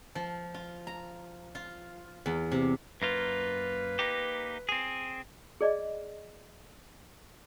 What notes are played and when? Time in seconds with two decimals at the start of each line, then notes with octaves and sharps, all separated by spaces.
0.15 F3
0.54 F4
0.87 A#5
1.55 F4
2.26 E2
2.52 C3
3.02 F#2 A#3 F4 B4
3.99 A#3 D#4 G4
4.69 C4 G#4
5.61 G#4 D5 D#5